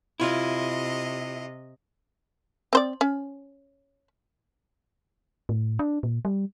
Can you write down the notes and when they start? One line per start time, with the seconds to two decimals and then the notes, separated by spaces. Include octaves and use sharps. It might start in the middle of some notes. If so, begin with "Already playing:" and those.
0.20 C3 E4 F4 D#5
2.73 C4 C5 D5
3.01 C#4
5.49 A2
5.79 D4
6.03 A#2
6.25 G3